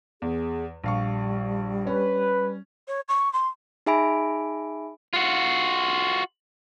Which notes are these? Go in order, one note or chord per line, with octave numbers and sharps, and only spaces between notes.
E2 G#4
A#1 G3 F5 C#6
C#4 B4
C#5
C#6
C6
D#4 G#4 E5 G#5 B5 D7
F4 F#4